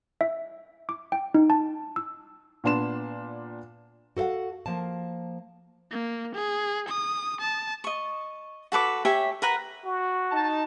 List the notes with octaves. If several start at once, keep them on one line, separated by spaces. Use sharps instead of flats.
E5
D6
G5
D#4
A5
E6
A#2 B3 D4 C6 E7
F#4 A4 B4 F5 F#5
F3 A#3 A5
A#3
G#4
D#6
A5
D#5 C#6
F#4 A4 B4 D6
G4 C#5 E5 G#5
A#4 B4 F#5 A#5
F#4
D#4 A5